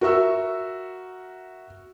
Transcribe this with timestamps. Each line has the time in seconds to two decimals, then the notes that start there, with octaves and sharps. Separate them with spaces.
0.01 F#4 A#4 E5 C#6 E6